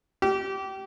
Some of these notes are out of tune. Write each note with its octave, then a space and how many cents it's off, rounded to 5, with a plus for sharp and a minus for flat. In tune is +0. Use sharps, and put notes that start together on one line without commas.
G4 -25